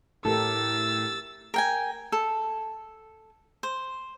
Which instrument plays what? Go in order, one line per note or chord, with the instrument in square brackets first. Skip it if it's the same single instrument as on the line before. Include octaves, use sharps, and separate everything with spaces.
[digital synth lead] A2 [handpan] E4 G4 A#4 [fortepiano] A4 [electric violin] E6 A6
[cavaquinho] A#4 G5 G#5
A4
C5